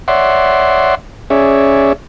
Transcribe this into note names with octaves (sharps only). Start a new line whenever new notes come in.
C#5 D5 E5 F#5 C6
C#4 G#4 C#5 D5 E5